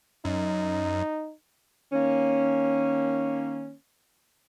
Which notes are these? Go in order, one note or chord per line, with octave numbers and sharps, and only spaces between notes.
F#2 D#4
D#3 A#3 C#4